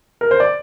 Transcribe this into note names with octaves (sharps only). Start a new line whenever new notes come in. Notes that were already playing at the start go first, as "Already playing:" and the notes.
A#4
C5
D5